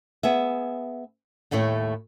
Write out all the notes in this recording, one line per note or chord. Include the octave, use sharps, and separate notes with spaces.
B3 G#4 E5
D#2 A2 A3 E4 C#5